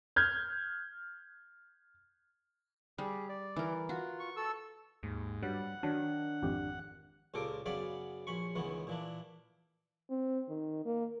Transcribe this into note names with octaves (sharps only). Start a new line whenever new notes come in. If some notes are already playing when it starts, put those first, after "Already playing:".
F6 G6 G#6
G3 G#4
D5
E3 A#4
F4 F#4
C#6
A4 C#6 E6
D#2 G#2
G2 F#3 G3 F#5
D#3 F#3 D4
G#1 F2 G4
C#2 A#2 G4 A4 A#4 D6
F#2 C#3 B3 D5 F5 B5
A#1 C#4 B5 C#6
C#2 D#3 E3 B3 C#4
A#2 E3 D4
C4
D#3
A#3